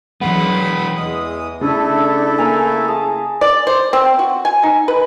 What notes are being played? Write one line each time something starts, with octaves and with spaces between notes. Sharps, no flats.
E3 F#3 G#3 B3 F#5 B5
E2 G#3 D#6
C#3 A3 D4 E4 A4
A#3 A#4 F5 G#5
G#4 A5
D5
C5
C4
F#4
G#5
D#4
B4